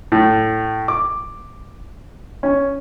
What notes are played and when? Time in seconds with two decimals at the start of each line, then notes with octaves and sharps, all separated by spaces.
0.12 A2
0.88 D6
2.43 C#4